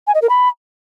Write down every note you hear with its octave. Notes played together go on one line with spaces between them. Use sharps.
G#5
D#5
A#4
B5